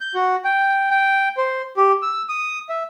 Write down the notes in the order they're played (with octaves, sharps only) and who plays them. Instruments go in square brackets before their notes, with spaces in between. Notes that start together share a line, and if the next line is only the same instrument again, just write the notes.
[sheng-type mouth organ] G6
F#4
G5
G5
C5
G4
E6
D#6
E5